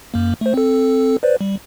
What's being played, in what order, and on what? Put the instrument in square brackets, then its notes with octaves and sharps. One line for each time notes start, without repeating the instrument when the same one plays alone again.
[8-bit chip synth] F#2 A#3
A3 C5
C4 A4
B4 C5 D5
G3